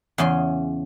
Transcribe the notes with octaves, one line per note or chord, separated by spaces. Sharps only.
E2 C#3 C#4 C6